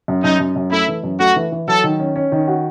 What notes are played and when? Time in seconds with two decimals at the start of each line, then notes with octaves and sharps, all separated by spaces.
0.08 F#2
0.23 F#2 D#4
0.40 F#2
0.56 F#2
0.72 A3 E4
0.88 E3
1.03 F#2
1.20 A3 F#4
1.36 E3
1.52 E3
1.67 F#3 A4
1.84 D#3
2.00 C#4
2.16 C#4
2.32 D#3
2.47 F#4